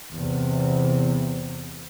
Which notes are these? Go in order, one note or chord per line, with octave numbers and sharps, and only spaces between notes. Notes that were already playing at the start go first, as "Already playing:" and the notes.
E2 C3